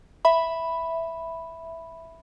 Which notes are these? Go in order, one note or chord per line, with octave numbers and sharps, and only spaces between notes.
E5 B5